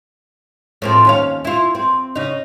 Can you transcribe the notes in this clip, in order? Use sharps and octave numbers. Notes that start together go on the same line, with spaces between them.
A2 F3 C4
D#2 C#4 F5
E4 F4
C4
C#3 D#4